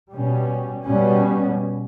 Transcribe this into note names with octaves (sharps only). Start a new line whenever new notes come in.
B2 G3 C#4
B2 G3 C#4